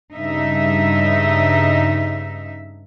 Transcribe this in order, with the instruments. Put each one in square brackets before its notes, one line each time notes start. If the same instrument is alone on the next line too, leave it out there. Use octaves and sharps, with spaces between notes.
[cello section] G2 C#3 D#4 E5